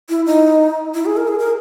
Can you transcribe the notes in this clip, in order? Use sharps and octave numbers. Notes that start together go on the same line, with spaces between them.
E4
D#4
E4
G#4
A#4
G#4
A#4